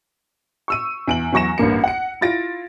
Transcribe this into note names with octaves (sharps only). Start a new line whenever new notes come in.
C#6 E6 D#7
E2 D7 F#7
E2 F#3 C#6 A#6 E7
A1 G2 A#3 C#7
F#5 C#7
E4 F4 A6 A#6 D7